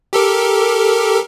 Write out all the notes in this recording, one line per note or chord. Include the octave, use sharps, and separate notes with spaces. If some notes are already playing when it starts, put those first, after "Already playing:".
G4 A4 A#4